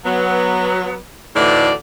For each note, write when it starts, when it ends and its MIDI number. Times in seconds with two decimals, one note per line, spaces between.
0.05 0.95 54
0.05 0.95 59
1.36 1.72 38
1.36 1.72 45
1.36 1.72 50
1.36 1.72 52
1.36 1.72 63
1.36 1.72 74